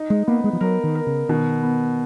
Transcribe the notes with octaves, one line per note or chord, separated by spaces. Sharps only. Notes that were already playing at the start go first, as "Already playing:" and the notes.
Already playing: D#4
G#3
A#3 B3
G#3
F3
F#3 A#4
D#3
A#4
C#3
B2 D#3
B3